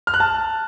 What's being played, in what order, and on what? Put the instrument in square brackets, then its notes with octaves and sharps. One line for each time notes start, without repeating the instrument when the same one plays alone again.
[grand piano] F6
F#6
A5